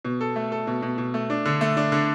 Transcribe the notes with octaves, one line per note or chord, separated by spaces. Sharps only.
B2
A4
A3
A4
B2
B2
B2
A3
D4
D3
A3
D4
D3